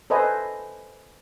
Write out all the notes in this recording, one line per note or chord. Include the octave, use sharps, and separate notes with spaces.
A4 B4 C5 D#5 E5 G#5